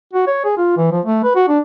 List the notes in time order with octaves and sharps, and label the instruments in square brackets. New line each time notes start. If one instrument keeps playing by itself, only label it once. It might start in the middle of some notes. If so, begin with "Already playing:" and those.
[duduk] F#4
C#5
G#4
F4
E3
F3
A3
B4
F#4
D4